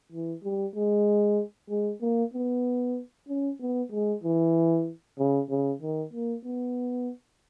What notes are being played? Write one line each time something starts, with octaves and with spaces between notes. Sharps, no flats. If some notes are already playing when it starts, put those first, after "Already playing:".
E3
G3
G#3
G#3
A#3
B3
C#4
B3
G#3
E3
C#3
C#3
D#3
A#3
B3